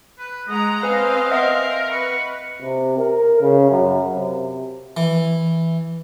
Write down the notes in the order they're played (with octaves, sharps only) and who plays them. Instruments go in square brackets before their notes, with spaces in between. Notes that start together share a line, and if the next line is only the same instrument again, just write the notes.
[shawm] B4
[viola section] G#3 F#5 A#5 [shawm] D#5
[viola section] C4 F5 [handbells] B4 G#5
[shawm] A#4 [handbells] D#5 E5 F#5
[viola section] B4 [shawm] C#6
[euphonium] C3
A#4
C#3
F#2
C3
[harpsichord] E3